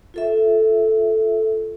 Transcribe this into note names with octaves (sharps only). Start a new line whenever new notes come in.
F4 A4 E5